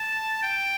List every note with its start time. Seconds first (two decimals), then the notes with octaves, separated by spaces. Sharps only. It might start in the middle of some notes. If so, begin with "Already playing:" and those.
Already playing: A5
0.43 G5